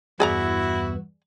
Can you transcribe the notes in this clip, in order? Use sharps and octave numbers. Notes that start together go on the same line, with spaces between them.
E2 G2 B3 E4 F#4 G#4 D5 A#5